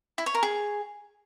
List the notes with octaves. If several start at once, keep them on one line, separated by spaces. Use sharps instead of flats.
E4
C#5
A#4
G#4